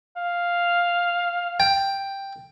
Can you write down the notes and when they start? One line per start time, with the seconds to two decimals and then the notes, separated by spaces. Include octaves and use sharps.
0.16 F5
1.60 G5